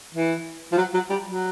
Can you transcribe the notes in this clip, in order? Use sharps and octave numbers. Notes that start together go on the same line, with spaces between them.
E3
F3
F#3
F#3
G3
F#3